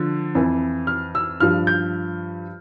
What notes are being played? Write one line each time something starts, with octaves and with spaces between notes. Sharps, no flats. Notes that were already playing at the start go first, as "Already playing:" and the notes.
Already playing: D3 F3
F2 E3
F6
E6
G2 F3 F6
G6